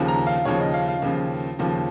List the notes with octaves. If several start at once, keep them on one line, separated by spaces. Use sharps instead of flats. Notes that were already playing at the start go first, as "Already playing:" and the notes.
Already playing: D#2 C#3 F3
A#5
F5
D#2 C#3 F3 C#5
D#5
F5
F5
D#2 C#3 F3
D#2 C#3 F3